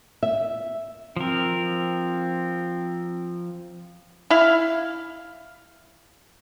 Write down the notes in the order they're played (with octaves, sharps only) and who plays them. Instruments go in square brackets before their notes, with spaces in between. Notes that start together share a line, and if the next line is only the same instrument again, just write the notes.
[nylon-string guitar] E5
[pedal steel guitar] F3 A#4 [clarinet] C4
[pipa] E4 F5